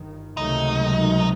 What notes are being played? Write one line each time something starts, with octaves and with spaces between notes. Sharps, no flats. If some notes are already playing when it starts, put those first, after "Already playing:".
Already playing: G1 G2 D#3
C#2 C3 D#3 F#3 A3 D#4